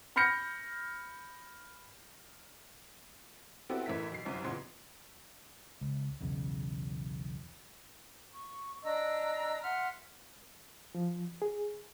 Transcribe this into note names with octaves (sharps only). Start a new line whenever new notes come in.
B5 F6 G6 A#6 C#7
B3 C4 E4 F#4 G4 A4
A1 E3 A3 A#4 E5 B6
B1 C7
G1 C2 F#2
A1 A#2 C#3 B3 C6
C#2
B1 E2 C#3
C#6
D4 D#5 A#5 E6
E5 F#5 C6 F6
F3
G#4